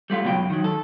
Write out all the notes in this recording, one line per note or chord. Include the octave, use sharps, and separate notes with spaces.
G3 A3 F4
C#2 B2 F#3 F#4 G5
F#2
D#3 F#3
A4